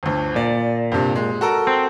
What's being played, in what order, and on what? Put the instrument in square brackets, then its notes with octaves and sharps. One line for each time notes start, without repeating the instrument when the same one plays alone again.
[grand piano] G1 D2
[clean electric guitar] A#2 [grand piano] D5
[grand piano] G2 C3
G#3
F#4 A4 A#4
[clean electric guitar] C4